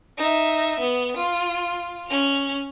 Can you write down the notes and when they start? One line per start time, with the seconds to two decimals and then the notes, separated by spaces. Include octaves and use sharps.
0.18 D#4 E5
0.80 B3
1.17 F4
2.07 C#4 F7